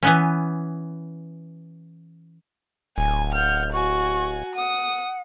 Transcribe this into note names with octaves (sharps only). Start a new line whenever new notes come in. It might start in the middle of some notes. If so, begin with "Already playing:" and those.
E3 B3 C#4
D1 G#5
F#5 F6 G6
F#4 G#5 C#6
F#5 D#6